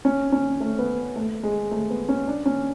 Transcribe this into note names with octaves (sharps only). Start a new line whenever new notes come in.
C#4
C#4
A3
B3
A3
G#3
A3
B3
C#4
D4
C#4